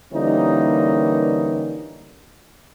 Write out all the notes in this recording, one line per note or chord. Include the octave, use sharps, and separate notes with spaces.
D3 E3 G3 A#3 C#4 D#4